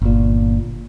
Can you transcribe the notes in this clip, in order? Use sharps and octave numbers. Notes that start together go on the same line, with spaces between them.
G1 A#2